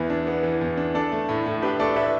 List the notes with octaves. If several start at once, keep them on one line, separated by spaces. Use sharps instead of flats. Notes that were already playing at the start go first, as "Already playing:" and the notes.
Already playing: E2 E3 B3 B4 E5
D4
B3
E3
E2
D4
D4 A4 D5
A3
A2
A2
D4 G4 B4
A3 A4 D5
A2 B4 E5